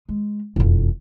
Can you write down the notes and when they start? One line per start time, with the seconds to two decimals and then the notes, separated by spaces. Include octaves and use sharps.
0.09 G#3
0.56 E1 F2